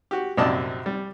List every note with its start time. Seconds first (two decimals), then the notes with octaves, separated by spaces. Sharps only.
0.11 F#4 G4
0.37 A#1 F#2 C3 D5 D#5 A5
0.86 G3